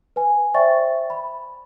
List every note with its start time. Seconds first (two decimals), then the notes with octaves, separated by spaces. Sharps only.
0.16 B4 G#5
0.54 C5 D5 E5 G5 C#6 A6
1.10 B5